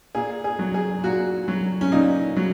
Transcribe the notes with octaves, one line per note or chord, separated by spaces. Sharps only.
A#2 G#4
G#4
F#3
G#4
A#2 F#4
F#3
C#4
A#2 D#4
F#3